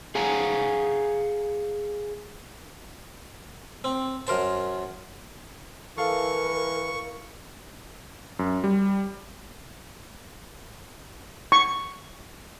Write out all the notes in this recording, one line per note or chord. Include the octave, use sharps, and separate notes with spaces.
G#4 F5 F#5 G#5 A#5
C4
F#2 A#4 C5 A5
E3 A4 A#4 F5 C#6
F#2
G3
C#6